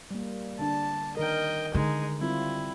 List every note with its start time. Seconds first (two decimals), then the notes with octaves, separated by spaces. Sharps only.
0.11 G3 A#3
0.59 D3 D4 A5
1.17 D#3 A#4 D#5 G5
1.74 D3 G#3 D#4
2.20 G3 C4 E4 F4